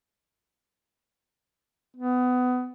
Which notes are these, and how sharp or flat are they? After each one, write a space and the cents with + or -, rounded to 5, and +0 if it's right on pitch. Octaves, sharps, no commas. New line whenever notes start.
B3 +20